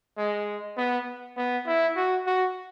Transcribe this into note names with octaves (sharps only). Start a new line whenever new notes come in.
G#3
B3
B3
E4
F#4
F#4